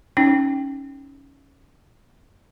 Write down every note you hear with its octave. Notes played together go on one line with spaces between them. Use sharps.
C#4 D#4 G5